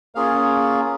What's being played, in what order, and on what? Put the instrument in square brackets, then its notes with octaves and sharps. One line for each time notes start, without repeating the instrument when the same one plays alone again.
[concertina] A#3 C#4 F4 G#4 F5